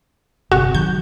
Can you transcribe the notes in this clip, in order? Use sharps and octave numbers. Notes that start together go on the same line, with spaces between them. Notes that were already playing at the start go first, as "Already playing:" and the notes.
G1 C3 F#4
D#3 F#3 G6